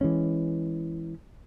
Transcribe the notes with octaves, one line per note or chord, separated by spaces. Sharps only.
E3 G#3 C#4